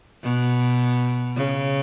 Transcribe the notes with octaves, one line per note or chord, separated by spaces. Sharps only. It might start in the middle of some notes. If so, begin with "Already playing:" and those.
B2
C#3